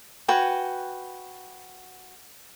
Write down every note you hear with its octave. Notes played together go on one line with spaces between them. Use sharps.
F#4 B4 G5 G#5